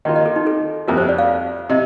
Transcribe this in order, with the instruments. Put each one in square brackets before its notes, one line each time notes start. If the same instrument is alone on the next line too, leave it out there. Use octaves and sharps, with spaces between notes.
[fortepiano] D#3 A#3 F4 [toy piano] D#5
[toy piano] D#5
A4
D#4
A4
[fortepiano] F2 C3 G3 [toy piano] A#4
[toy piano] C5
D5
F5
[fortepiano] C3 [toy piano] D#5